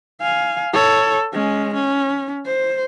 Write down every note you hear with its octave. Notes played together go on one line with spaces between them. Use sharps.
F5 G#5
A4 C#5
G#3 C#4
C#4
C5